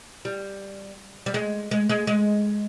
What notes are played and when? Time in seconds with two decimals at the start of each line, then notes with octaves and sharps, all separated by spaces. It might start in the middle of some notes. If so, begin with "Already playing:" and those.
0.25 G3
1.26 G3
1.34 G#3
1.71 G#3
1.89 G#3
2.07 G#3